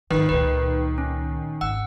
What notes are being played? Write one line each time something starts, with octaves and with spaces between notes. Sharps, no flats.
G#1 C#2 D#3 B4
C#2 A#2 B4
C#4
G#1 F#5 E6